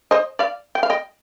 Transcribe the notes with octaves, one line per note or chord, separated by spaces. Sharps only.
C5 D#5
D5 F5
G5
F5
D#5 G5